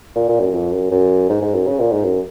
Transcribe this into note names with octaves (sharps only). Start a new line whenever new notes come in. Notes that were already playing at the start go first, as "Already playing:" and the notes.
A#2
A#2
F#2
F2
F#2
F#2
G#2
G#2
F#2
C#3
A#2
G#2
F#2